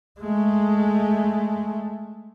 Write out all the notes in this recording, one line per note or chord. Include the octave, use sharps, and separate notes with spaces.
G#3 A3